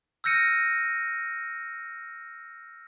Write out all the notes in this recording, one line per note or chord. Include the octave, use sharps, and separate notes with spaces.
E6 F6 G6 A#6 C#7 D#7